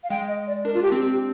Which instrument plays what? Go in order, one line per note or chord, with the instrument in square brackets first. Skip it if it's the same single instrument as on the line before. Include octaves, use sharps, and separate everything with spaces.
[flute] F5
[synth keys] G#3 [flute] G5
[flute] D#5
D5
[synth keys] D4 [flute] A#4
[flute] F4
G4
[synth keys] C4
[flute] G4